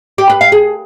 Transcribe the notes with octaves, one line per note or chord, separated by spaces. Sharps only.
G4
B4
F5
G#4